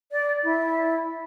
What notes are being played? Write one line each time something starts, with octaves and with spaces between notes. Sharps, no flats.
D5
E4